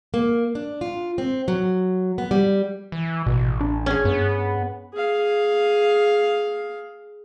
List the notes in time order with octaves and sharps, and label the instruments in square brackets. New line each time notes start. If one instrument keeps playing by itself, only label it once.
[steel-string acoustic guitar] A#3
D4
F4
C4
F#3
B3
G3
[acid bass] E3
[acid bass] A1 [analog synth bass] B2
[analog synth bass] D4
[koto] C#4 G#4
[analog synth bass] G2 [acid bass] B3
[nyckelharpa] G#4 F5